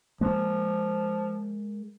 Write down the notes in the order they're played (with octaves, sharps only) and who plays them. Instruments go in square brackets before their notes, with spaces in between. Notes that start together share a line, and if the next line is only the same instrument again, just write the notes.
[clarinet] F3 [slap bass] G#3 A#3